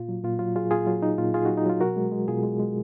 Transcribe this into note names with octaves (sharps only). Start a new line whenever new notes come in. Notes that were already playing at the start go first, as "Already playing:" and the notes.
Already playing: A#2 F4
F#3
A#2 F4
F#3 F4
F#3 F4 G#4
A#2 F4 G#4
F#3 F4
F#3 D#4
A#2 F4
A#2 F4 G#4
F#3 D#4 F#4
D#4
F#3 F4
B2 F#4 A#4
G#3
G#3
B2 F4 G#4
G#3
G#3